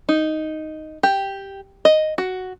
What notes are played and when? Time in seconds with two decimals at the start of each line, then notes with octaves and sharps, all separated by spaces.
0.09 D#4
1.03 G4
1.85 D#5
2.18 F#4